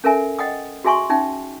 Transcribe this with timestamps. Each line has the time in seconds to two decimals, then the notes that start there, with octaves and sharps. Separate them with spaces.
0.04 C#4 A4 A#4 E5 G#5
0.39 D#5 F#5 G5 D#6
0.84 F#4 G#4 E5 G#5 C6 C#6
1.09 C#4 D#4 E5 G5